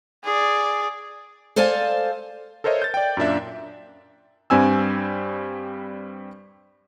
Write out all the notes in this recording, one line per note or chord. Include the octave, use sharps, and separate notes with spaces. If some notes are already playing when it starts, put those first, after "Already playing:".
G#4 D5
A4 C5 D5 F5 G#5 A5
A4 A#4 C5 C#5 D#5 E5
G6 A6
D5 G5
F#2 A#2 D4 E5
G2 G3 C4 G#5 E6